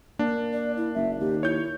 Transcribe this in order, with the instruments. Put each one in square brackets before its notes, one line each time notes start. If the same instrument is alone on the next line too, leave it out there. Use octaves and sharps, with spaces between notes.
[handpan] A#3 [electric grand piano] D4
[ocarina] D5
E4
[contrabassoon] F#1 [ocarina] E5
[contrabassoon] D#2 [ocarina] G4
[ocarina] E4 [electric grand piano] C#5 G6